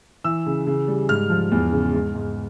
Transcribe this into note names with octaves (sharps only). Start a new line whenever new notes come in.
E3 E6
C#3
C#3
G3
G#2 F6
F3
E2
C#3
G#2
G#2